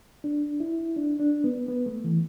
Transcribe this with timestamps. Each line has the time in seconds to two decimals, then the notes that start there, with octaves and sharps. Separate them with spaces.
0.24 D4
0.60 E4
0.97 D4
1.20 D4
1.44 B3
1.68 B3
1.86 A3
2.04 E3